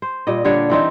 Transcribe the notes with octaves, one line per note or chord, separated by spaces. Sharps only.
C5
A#2 G3 D#5
D3 G3 D4 C#5
E3 C4 D#4